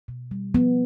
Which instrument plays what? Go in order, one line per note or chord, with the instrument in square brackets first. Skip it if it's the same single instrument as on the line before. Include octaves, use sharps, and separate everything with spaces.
[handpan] B2
G3
F3 B3